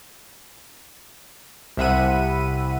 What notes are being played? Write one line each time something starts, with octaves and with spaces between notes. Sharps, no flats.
C2 C3 E5 F#5 B5 D#7